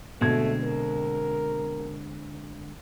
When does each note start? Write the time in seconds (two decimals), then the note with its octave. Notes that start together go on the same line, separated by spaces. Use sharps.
0.21 B2 D3 G#3 A3 C4 G#6
0.64 A#4